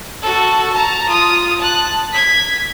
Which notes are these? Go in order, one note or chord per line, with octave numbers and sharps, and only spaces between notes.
F#4 A4
A5 A#5
F4 D#6
A5 F#6
G#6 B6